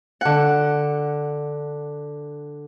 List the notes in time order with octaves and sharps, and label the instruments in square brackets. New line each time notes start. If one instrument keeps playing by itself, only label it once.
[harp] D3 F#5